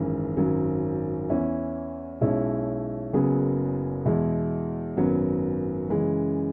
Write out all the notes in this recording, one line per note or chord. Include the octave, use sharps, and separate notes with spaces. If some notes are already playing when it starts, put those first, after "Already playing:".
Already playing: G#1 F#2 E3 G#3
G#1 F#2 F#3
E2 E3 C#4 E4
B1 B2 G#3 C#4 E4
F#1 F#2 F#3 B3 G#4
E2 B2 G#3 E4
G#1 F#2 F#3 B3
F#2 C#3 E3 G#3